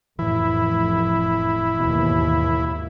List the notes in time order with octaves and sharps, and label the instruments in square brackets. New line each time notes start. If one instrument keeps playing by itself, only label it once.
[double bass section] F1 [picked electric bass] A2 E3 [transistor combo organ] E4
[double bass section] D#2 G#2 [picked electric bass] B2 E3